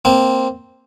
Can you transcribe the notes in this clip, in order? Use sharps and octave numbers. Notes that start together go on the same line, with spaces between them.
A#3 C4